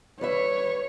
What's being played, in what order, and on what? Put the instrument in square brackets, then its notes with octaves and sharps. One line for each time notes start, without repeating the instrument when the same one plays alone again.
[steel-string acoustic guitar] G3 B4 E5 [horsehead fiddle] C#5